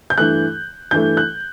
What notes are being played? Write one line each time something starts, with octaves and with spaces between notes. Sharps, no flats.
G6
G2 E3 A3 F#6
G2 E3 A3 G6
F#6